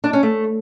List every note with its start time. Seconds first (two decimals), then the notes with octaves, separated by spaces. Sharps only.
0.04 D4
0.13 C#4
0.23 A3